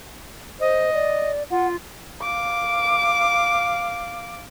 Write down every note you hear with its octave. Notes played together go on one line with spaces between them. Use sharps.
C5 D#5
D5
F4 F#5
F5 D6